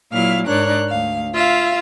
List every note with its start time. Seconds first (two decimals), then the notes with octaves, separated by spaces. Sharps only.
0.12 A#2 F#3 E4 F5 F6
0.47 G#2 D4 A#4 C#5 D5 F#6
0.89 D2 F5
1.34 F4 E5 F5